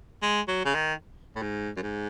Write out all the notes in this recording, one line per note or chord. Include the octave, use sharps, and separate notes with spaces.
G#3
F#3
C#3
D#3
A2
G#2
F#2
G#2